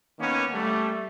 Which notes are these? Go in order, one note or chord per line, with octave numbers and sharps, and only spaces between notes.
D#3 A#3 B3 C#4
G3 A3